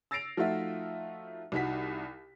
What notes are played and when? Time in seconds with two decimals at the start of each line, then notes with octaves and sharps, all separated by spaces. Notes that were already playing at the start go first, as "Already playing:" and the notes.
0.11 E6 A6 A#6 C7 D7 F7
0.37 F3 A3 D#4 F4 F#4 E5
1.52 C2 D#4 F#4 B6